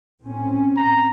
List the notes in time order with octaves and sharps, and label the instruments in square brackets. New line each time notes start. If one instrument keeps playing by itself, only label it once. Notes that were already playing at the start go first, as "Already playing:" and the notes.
[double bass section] A2 C4 C#4
[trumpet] A#5